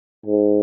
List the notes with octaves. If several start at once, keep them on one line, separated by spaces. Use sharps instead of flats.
G#2